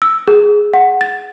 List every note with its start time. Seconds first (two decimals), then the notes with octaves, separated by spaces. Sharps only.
0.02 E6
0.28 G#4
0.74 F#5
1.01 A6